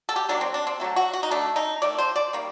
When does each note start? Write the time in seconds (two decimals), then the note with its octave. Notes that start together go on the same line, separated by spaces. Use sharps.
0.09 A4
0.16 G4
0.29 D#3 F#3 A#3 D4
0.41 C4
0.54 D4
0.67 C4
0.80 D3 F#3 A3
0.96 F#4
1.13 F#4
1.23 D#4
1.31 D3 A3 D4
1.56 D#4
1.82 D#3 A3 D5
1.98 C5
2.16 D5
2.33 D#3 G3 A#3